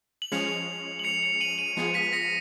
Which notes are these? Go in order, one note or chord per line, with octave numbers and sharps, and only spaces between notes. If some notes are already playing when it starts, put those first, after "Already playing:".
F#7
F3 G#3 C#4 G#4 C#7 F7
F#7
C#7 F7
C#7 F7
D#7 F#7
D#7 F#7
F3 G#3 B3 F4 G#4
B6 D#7
A#6 C#7